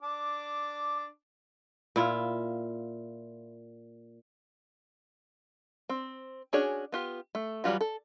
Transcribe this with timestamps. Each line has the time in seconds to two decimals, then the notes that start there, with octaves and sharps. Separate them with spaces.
0.02 D4 D6
1.96 A#2 E4 F4
5.89 C4
6.53 C#4 D4 F#4 G#4 C#5
6.92 B3 F4 G4
7.35 A3
7.64 E3 F#3 G3 F4 F#4
7.81 A4